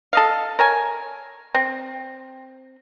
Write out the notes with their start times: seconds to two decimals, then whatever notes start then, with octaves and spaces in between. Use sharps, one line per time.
0.13 A4 D#5 F5
0.59 A#4 C#5 G#5
1.54 C4